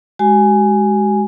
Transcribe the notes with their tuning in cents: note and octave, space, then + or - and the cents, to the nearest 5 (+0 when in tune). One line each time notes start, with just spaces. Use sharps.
G#3 +0 F#4 +45 G#5 +0